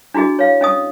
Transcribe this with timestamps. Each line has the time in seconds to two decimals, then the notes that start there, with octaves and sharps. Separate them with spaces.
0.14 D4 E4 F#4 G#4 D#5
0.39 C#5 F5
0.61 C#4 D#5 D#6